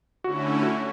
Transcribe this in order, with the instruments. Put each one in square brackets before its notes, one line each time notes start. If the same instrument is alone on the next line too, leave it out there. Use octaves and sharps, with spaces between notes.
[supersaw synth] D3 A3 C#4 E4 [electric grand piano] F#4
[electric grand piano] F#4